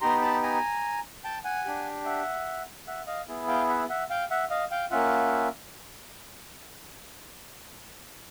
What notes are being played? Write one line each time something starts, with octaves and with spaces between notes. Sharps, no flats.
B3 D#4 G4 A#5 C6
A5 B5
G#5 A#5
G5 A5
F#5 G#5
D4 G4
E5 F#5
E5 F#5
D#5 F5
B3 E4 G#4
F5 G5
E5 F#5
E5 F#5
F5 G5
E5 F#5
D#5 F5
F5 G5
A#3 C#4 F4 E5 F#5